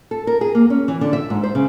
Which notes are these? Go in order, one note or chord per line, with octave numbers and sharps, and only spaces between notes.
A4
A#4
G#4
A#3
C#4
E3
D3
E5
G#2
C5
C#3